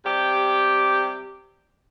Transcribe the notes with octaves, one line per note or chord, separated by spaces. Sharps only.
C3 G3 G4